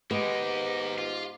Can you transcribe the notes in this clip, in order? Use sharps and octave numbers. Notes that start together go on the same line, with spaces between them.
G#3 A#3 B3 D#4 G4
G#2
F4